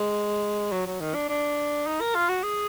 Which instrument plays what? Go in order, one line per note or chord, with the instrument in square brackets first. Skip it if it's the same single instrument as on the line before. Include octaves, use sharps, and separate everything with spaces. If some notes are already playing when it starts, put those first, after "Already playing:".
Already playing: [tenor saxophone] G#3
F#3
F#3
D#3
D4
D4
D#4
A#4
F4
F#4
G#4